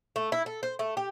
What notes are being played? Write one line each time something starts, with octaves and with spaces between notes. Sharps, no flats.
A3
E4
A4
C5
A3
G4